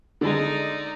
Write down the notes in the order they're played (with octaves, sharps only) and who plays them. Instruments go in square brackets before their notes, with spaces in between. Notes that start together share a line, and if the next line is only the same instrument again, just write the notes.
[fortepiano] D3 G#3 [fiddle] D#4 D5